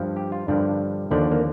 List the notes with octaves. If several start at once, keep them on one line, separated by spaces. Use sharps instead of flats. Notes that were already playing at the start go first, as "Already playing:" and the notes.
Already playing: G2 F3
G4
F4
G2 D3 F3 D4
D#2 D3 F3 D4
A#3